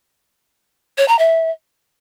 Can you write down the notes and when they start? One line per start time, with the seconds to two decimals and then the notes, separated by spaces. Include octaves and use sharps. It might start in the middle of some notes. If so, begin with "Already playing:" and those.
0.98 C#5
1.08 A#5
1.19 E5